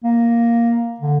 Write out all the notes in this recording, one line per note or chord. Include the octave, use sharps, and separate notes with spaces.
A#3
D3